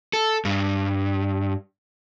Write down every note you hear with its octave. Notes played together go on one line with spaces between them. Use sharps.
A4
G2